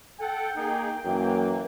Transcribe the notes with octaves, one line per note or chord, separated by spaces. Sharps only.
A4 F#5 G5
A#3 D#4 G#4
F#2 E3 A#3